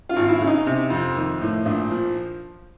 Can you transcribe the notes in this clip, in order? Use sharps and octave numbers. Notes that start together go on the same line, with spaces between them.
F4
G#1
E4
C#3
D#4
C3
F2
D#3
A2
A#1
F3